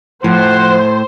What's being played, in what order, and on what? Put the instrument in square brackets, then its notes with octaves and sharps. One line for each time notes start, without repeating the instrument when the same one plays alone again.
[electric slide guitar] A2 [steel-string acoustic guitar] F3 [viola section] C5 [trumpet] F#5